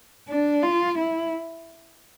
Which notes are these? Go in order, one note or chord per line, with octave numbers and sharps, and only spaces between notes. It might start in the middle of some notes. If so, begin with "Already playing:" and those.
D4
F4
E4